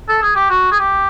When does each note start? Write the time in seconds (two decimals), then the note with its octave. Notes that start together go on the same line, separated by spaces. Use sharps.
0.09 A4
0.22 G#4
0.36 G4
0.50 F#4
0.72 G#4
0.80 G4